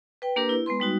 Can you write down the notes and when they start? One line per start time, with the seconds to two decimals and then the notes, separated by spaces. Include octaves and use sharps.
0.22 B4 G5
0.36 A#3 D4 G4 A#4 B4
0.49 E4
0.66 G#3 B3 B4 C6
0.80 G3 D#4 F#4